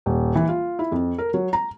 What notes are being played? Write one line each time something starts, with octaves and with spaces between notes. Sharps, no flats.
D#1
E3
F4
E4
F2
A#4
F#3
A#5